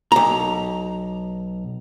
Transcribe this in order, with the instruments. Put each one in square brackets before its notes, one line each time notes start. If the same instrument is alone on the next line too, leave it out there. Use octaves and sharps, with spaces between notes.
[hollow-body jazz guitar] B1 A#5